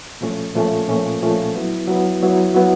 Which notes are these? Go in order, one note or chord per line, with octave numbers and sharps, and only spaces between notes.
A#2 F3 A3 C#4
A#2 F3 A3 C#4
A#2 F3 A3 C#4
A#2 F3 A3 C#4
F#3 B3 E4
F#3 B3 E4
F#3 B3 E4
F#3 B3 E4